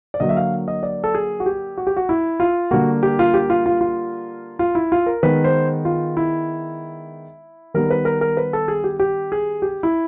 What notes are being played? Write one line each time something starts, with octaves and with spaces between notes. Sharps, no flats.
D5
D3 F#3 A#3 D#5
E5
F5
D#5
D5
A4
G#4
F#4
G4
F#4
G4
F#4
E4
F4
D3 G3 A#3 F#4
G4
F4
G4
F4
F4
F4
F4
E4
F4
A#4
D#3 G#3 B3 B4
C5
F4
E4
D#3 G3 B3 A#4
B4
A#4
A#4
B4
A4
G#4
G4
G4
G#4
G4
E4